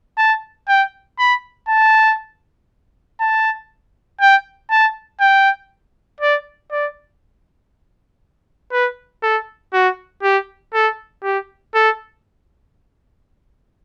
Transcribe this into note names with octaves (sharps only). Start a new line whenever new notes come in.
A5
G5
B5
A5
A5
G5
A5
G5
D5
D5
B4
A4
F#4
G4
A4
G4
A4